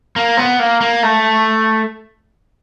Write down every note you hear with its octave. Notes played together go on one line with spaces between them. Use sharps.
A#3
B3
A#3
A#3
A3